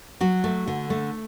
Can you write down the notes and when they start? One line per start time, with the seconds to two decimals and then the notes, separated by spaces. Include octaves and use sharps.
0.21 F#3 F#4
0.44 A3
0.67 D3
0.90 A3